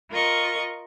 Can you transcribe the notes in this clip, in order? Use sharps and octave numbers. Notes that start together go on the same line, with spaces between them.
F4 A#4 D#5 C#6